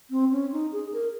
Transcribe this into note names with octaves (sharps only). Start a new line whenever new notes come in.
C4
C#4
D#4
G#4
A#4